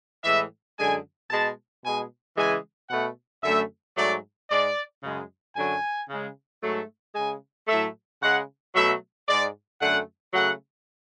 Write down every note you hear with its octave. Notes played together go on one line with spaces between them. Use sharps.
A2 E3 G#3 E5
F#2 D3 G#3 G#5
B2 G#3 A5
B2 G#3 G#5
C#3 E3 G#3 G#5
B2 A3 F#5
F#2 D3 A3 E5
G#2 F#3 A3 D5
G#2 G#3 D5
F#2 C#3 G#3
F#2 D3 F#3 G#5
C#3 G#3
G#2 F#3 A3
C#3 G#3 G#5
A2 F#3 A3 E5
C#3 G#3 F#5
B2 F#3 A3 E5
G#2 G#3 D5
F#2 D3 A3 F#5
C#3 F#3 A3 F#5